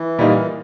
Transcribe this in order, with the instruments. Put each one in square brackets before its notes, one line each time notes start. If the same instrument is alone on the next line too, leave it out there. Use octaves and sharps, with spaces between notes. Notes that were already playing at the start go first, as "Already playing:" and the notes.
Already playing: [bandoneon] E3
[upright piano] A#2 G3 A#3 D#4